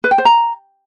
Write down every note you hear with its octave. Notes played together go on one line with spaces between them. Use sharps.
B4
G5
C5
A#5